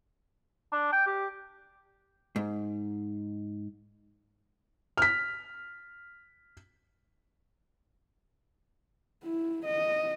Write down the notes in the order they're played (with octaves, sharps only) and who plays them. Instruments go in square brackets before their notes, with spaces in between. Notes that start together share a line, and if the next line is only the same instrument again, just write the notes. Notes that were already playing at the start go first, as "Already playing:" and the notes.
[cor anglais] D4
G5
G4
[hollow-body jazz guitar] G#2
[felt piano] F6 B6
[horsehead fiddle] E4
D#5